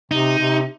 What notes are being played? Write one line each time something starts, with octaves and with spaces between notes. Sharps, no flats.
C3 D#4
C3